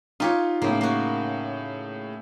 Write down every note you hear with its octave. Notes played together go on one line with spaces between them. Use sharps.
D#4 F4 G4 C#5
A2 C#3 A#3
A#3 F#4